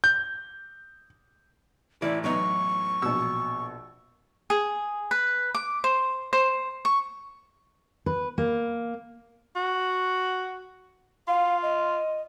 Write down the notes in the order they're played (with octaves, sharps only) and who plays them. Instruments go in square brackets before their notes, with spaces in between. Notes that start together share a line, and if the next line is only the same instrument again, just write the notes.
[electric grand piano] G6
[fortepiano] A1 [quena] E4 [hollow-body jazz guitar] D5
[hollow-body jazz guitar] F#3 B3 D#4 [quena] C#6
[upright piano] A#1 B2 [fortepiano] E6
[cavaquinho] G#4
B4
D6
C5
C5
C#6
[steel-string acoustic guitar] B4
A#3
[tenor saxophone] F#4
[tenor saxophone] F4 [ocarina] F5
[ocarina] D#5